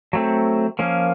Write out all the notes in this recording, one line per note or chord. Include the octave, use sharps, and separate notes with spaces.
F#3 A3 C4
F3 A#3 C#4